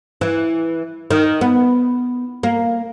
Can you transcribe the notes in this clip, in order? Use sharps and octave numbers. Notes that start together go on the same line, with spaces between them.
E3
D#3
B3
A#3